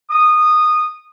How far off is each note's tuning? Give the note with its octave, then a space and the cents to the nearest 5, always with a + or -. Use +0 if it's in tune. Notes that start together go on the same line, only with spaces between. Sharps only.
D#6 -15